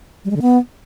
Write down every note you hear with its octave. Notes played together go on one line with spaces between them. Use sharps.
G3
G#3
D3
B3